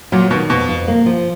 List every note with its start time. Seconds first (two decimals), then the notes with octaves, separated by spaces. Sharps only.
0.12 A#2 F#3
0.30 B2 D#3
0.50 F2 B2
0.69 F2
0.88 A#3
1.06 F3